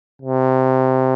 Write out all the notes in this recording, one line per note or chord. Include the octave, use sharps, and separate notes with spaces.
C3